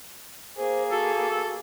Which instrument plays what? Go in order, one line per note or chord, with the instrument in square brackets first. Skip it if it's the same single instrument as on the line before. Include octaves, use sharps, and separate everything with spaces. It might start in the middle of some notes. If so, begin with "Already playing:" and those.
[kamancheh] A#3 G#4 [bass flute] C5
[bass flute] F#4 [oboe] A4